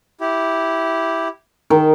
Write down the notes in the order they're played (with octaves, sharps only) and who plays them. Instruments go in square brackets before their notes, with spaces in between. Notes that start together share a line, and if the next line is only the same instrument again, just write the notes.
[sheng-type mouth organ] E4 G4
[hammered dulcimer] D#3